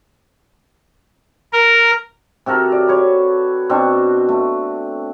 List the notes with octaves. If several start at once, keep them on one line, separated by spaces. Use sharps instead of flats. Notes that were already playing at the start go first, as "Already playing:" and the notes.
A#4
C3 F#4 A4 A#4
D5
B4 C#5
B2 C4 D4 C#6
A3